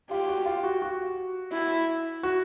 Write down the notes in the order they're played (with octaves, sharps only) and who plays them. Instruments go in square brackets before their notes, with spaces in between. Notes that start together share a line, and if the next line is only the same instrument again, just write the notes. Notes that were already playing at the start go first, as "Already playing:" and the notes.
[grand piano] F4 [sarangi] G4
[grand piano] F#4
F4
F#4
F#4
[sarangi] E4
[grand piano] F#4